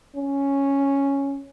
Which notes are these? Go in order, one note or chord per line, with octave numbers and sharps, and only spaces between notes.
C#4